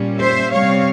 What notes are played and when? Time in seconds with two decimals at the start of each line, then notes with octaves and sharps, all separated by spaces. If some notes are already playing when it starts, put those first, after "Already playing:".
Already playing: A#2 G3 C#4
0.18 C5 E5
0.51 C3 G3 C4 C#5 F5